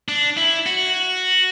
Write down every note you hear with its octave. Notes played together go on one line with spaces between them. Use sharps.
D4
E4
F#4